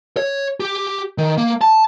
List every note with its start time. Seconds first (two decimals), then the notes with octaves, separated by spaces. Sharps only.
0.17 C#5
0.60 G4
1.18 D#3
1.38 A#3
1.61 A5